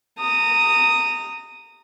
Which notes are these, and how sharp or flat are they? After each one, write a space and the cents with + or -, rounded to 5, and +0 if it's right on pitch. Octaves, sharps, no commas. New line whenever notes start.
A#5 -25 D#6 +0